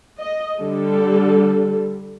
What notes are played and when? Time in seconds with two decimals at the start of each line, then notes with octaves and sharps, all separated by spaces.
0.20 D#5
0.60 D3 G3 A4